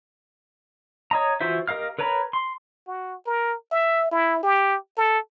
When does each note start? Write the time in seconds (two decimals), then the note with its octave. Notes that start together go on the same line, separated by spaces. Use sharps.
1.11 C#5 D#5 A#5
1.41 E3 F4 F#4 C5 E5
1.68 G4 A#4 D#5 F5 F6
1.99 A#4 B4 C#5 A#5 B5
2.33 C6
2.87 F#4
3.26 A#4
3.71 E5
4.12 E4
4.43 G4
4.97 A4